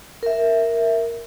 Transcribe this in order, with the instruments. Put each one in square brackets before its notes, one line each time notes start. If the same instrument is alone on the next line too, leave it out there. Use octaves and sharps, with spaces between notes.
[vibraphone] A#4 E5